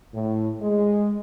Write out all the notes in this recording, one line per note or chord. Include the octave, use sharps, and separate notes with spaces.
A2
G#3